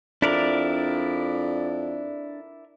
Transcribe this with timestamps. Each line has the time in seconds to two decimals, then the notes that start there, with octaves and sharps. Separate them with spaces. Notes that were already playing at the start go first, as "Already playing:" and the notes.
0.22 F2 D4 E4 A#4 D5